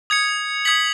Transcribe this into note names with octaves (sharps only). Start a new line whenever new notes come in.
D#6 G#6 C#7
D#6 G#6 B6 F#7